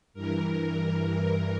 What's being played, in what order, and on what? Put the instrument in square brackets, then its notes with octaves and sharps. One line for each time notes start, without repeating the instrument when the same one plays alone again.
[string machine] G2 E3 A#4